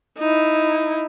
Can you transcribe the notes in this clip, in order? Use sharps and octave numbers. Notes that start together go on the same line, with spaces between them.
D#4 E4